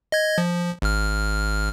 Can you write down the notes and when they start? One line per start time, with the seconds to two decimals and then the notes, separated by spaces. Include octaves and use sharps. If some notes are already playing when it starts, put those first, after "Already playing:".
0.12 D#5 G#6
0.38 F3
0.82 G#1 F6